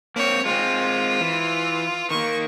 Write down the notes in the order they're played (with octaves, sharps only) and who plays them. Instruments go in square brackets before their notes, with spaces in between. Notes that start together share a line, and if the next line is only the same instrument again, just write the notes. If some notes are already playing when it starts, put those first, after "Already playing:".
[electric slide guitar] A#3 C4 [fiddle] C#5
[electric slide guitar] G#3 A#3 C4 [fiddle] F4
[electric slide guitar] E3
[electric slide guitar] D#3 A#3 [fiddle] C#6